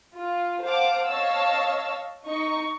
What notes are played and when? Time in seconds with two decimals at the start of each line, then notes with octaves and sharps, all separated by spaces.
0.15 F4
0.62 C5 F5 F#5 A5 D6
1.05 C#5 D#5 F5 A5 E6
2.26 D#4 C#6